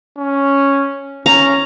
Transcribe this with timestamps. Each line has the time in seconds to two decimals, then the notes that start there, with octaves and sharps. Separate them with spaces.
0.18 C#4
1.26 C#4 A#5